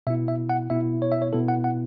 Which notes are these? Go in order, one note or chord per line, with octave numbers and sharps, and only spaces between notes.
B2 B3 E4 E5
E5
F#5
B2 B3 E4 E5
C#5
E5
C#5
B2 B3 E4 A4
F#5
F#5